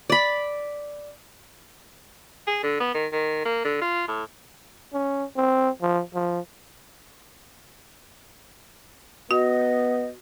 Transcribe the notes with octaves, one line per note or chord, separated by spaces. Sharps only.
D5 B5
G#4
D3
B3
D#3
D#3
A#3
D3
F4
A2
C#4
C4
F3
F3
B3 F#4 D#5